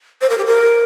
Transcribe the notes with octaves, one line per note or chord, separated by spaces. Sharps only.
C5
A#4
G4
A#4